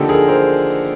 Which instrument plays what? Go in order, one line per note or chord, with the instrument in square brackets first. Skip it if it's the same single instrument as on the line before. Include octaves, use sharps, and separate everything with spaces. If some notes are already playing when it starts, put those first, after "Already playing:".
Already playing: [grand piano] D3 F3 A#3 D#4 G4 A4
G#4 A#4
A#4 C5